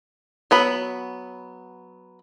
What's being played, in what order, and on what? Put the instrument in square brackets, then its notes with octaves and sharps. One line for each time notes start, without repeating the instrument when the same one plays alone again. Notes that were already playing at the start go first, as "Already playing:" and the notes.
[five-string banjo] F#3 B3 B5